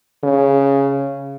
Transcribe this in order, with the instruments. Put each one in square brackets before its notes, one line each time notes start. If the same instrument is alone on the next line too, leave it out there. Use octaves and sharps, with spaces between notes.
[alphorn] C#3